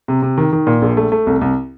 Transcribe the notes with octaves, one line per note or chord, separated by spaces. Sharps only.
C3
C3
D#3
D#3
A#2
A#1
A3
A3
C2
C2